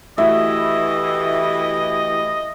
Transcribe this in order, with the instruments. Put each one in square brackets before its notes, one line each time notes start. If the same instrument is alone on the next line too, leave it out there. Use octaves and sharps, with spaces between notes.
[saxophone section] E3 G4 [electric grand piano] A3 E4 F#4 [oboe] D#5 [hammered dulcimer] E5